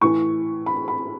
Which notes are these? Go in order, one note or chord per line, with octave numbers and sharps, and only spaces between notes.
A2 E3 C#6
B5
B5